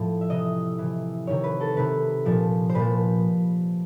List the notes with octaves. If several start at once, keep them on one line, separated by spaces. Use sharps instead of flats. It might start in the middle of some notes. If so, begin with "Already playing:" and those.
Already playing: A2 F3
E5
C3 E3 D#5
C3 E3
C3 D#3 C#5
B4
A4
C3 D#3 B4
A#2 F3
C5
A#2 F3 B4